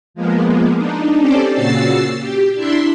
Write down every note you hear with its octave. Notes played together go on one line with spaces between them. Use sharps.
F3 G#3 A#3 B3
D4 D#4
C4 C#4 G4 A4 C5 D5
A#2 C#3 F#4 E6 A6 C7
G4
D4 E4 E5 C6